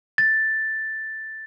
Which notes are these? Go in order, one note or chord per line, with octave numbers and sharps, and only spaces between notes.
A6